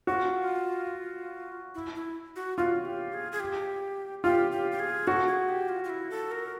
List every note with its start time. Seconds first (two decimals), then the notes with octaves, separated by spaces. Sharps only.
0.07 F4 F#4
1.75 E4
1.95 E4
2.36 F#4
2.58 F4 F#4
2.85 G4
3.13 G#4
3.32 G#4
3.40 G4
4.24 F4 G4
4.52 G4
4.72 G4
4.79 G#4
5.07 F#4 A4
5.27 G#4
5.49 G4
5.69 F4
5.84 F4
5.90 E4
6.10 A4
6.31 A#4